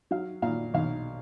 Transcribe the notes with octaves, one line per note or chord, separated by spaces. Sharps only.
F#3 F5
A#2 F5
B1 F5